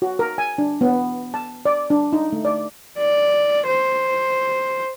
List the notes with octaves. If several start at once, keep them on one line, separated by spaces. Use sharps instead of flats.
F#4
A#4
G#5
D4
B3
A5
D5
D4
D#4
A3
D5
D5
C5